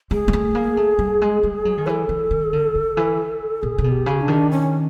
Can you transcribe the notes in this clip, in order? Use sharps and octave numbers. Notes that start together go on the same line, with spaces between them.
G#3 G#4
G#3
A3
A#3
A3
G3
G#3
G3
F#3
D#3
E3 A4 C#5
E3
D#3
D3
D3
E3
A#2 G#4
C3
B2
G4
C#3
D4
D#3
C#4